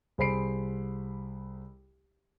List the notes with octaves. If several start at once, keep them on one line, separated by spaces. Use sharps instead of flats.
C2 G#4 C5 B5 C7 D7